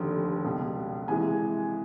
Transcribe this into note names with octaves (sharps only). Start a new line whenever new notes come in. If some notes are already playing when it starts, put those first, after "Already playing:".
Already playing: F1 D#2 D3
C#2 B2 G3
C3 E3 G#3 G#5